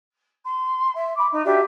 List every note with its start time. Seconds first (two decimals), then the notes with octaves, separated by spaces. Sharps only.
0.43 C6
0.95 E5
1.17 B5 D6
1.31 D#4
1.44 D4 F#4 G4 E5